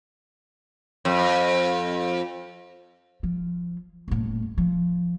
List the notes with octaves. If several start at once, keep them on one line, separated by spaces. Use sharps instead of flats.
F2
F3
D#1 A2
F3